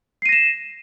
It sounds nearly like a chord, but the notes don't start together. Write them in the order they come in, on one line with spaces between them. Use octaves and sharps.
C7 D#7 A#6 E7